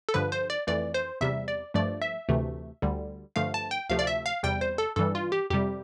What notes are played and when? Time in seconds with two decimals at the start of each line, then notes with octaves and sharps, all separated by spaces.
0.09 A4
0.14 G2 D3 F3 B4
0.32 C5
0.50 D5
0.67 F2 E3 A3 D5
0.94 C5
1.21 E2 C3 G3 E5
1.48 D5
1.74 G2 F3 A3 D5
2.02 E5
2.29 D2 C3 E3 A3
2.82 D2 D3 G3
3.36 G2 D3 F3 A3 F5
3.54 A5
3.71 G5
3.90 D2 C3 F3 A3 F5
3.99 D5
4.07 E5
4.26 F5
4.43 E2 C3 G3 G5
4.61 C5
4.78 A4
4.96 G2 E3 G3 A4
5.15 F4
5.32 G4
5.50 F2 C3 G3 G4